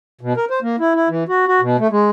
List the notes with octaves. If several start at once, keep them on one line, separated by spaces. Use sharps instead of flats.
B2
A#4
C5
A#3
E4
E4
E3
F#4
F#4
B2
A3
G#3